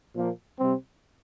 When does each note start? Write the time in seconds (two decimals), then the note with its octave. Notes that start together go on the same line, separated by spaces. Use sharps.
0.14 A#2 F3 A#3
0.57 C3 G3 C4